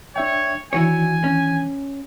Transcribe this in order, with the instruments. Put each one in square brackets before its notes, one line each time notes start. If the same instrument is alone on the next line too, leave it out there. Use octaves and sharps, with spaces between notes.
[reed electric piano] D4 E5 G5 [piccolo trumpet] C#5
[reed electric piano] D#3 E3 D4 [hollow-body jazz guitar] E4 F#4 C#5 [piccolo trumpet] G#5
[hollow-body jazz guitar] C#4